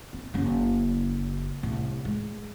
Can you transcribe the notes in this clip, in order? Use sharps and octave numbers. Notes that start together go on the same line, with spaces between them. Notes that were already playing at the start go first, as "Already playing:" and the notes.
C4
F#1 C#4
C2 A2
G#3